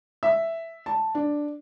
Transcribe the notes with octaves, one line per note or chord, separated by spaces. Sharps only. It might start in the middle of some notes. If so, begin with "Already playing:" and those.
E5
A5
D4